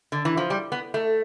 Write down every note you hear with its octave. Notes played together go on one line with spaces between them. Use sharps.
D3
E3
F3
G3
B3
A3